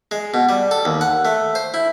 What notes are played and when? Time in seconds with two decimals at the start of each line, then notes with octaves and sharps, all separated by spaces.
0.11 G#3
0.34 B2
0.49 G3
0.71 A4
0.85 D#2
1.01 F#5
1.25 A3
1.55 C5
1.74 E4